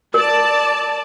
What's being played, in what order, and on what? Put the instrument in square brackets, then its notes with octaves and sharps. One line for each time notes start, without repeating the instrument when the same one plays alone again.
[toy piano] A#4 [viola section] D5 A5